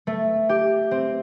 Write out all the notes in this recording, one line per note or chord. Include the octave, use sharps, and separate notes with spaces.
A3
G4
C4